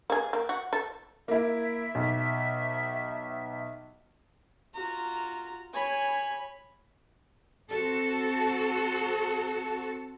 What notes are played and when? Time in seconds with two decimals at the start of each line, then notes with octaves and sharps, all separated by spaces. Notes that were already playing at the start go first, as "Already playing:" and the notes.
0.10 A#3 G#4
0.33 A#3
0.49 F#4
0.73 A4
1.28 A#3 E4 E5
1.95 B1
4.74 F4 F#4 A#5
5.73 C#5 G#5 B5
7.72 C4 F#4 A4